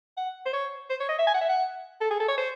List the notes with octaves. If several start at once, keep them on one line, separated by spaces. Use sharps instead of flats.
F#5
C5
C#5
C5
C#5
D#5
E5
G#5
F#5
E5
F#5
A4
G#4
A4
C#5
C5